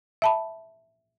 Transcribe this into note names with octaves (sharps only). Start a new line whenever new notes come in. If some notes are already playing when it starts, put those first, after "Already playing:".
E5 A5 B5